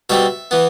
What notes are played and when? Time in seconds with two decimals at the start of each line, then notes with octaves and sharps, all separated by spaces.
0.10 B2 G3 C4 E5
0.51 E3 B3